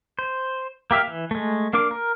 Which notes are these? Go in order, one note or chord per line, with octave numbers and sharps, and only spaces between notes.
C5
A#3 G4 E5 F5
E3
G#3 A3
A#3 D4 A#4 D6
A#4